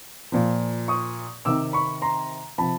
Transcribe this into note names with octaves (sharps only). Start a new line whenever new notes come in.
A#2 F3
C#6 D#6
C3 D#3 D6 E6
B5 C#6
A#5 C6
C3 F3 A5 B5